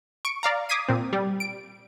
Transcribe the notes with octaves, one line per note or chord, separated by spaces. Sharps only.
C#6 D7
D5 F5 A#5
D6 D#6 G#6 B6 C7 D#7
A#2 C4
G3
D7